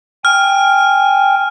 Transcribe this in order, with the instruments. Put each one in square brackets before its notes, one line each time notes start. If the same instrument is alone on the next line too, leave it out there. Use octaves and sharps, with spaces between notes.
[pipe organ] G5 G#5 [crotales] F6